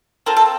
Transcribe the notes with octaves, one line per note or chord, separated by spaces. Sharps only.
C4 F4 A4 A#4
A4